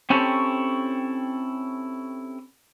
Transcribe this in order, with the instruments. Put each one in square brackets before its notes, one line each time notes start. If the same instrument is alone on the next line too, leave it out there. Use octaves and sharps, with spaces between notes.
[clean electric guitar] C4 C#4 E4 G4 A4 C#5